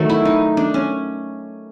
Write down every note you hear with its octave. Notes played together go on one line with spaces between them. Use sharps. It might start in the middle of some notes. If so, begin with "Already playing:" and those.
Already playing: D#3 F#3 A3
E4
D#4
D4
C#4